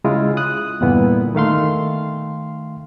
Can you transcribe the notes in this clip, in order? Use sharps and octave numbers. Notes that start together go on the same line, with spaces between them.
C#3 G#3 E4 F4
D#6 F#6
E2 G2 A#2 D3 B3 E4
D#3 A3 F5 C6